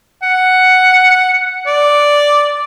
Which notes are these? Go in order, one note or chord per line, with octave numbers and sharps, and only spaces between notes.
F#5
D5